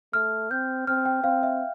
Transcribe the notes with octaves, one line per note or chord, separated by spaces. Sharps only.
A3 F6
C4 G6
C4 F6
G5
C4 F5
E5